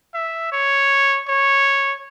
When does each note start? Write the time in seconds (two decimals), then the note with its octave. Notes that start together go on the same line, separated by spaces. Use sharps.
0.14 E5
0.52 C#5
1.28 C#5